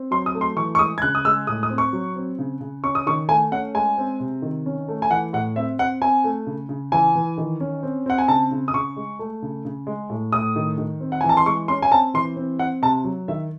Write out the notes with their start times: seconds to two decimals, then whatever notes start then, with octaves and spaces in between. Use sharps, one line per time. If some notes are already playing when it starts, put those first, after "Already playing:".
Already playing: C4
0.11 F#3 C6
0.26 D#6
0.35 A3
0.41 C6
0.56 E3 C#6
0.75 C#6
0.79 G#3 D#6
0.98 G#6
1.02 C#3 F#6
1.15 D#6
1.25 G#3 E6
1.47 A2 D#6
1.63 D#6
1.70 C4
1.78 C#6
1.93 F#3
2.16 C4
2.39 C#3
2.60 C#3
2.84 C#4 C#6
2.95 D#6
3.06 D#3 C#6
3.29 A3 G#5
3.52 C#4 F#5
3.74 G#3 G#5
3.98 C4
4.20 C3
4.42 D#3
4.66 C#4
4.88 A3
5.02 G#5
5.10 E3 F#5
5.33 A2 F#5
5.56 C4 E5
5.79 C4 F#5
6.02 C4 G#5
6.24 A3
6.47 C#3
6.69 C#3
6.92 E3 G#5
7.15 E3
7.38 D#3
7.60 C#4
7.83 C4
8.06 C4 F#5
8.18 G#5
8.28 C#3 A5
8.51 C#3
8.68 D#6
8.73 C#3 C#6
8.96 G#3
9.19 A3
9.42 C#3
9.65 C#3
9.87 G#3
10.10 A2
10.32 A2 D#6
10.56 D#3
10.78 D#3
11.00 C4
11.12 F#5
11.21 E3 G#5
11.29 A5
11.37 C6
11.46 G#3 C#6
11.68 C#4 C6
11.82 G#5
11.92 C4 A5
12.14 E3 C6
12.36 C4
12.59 C4 F#5
12.82 C3 A5
13.04 F#3
13.28 D#3 E5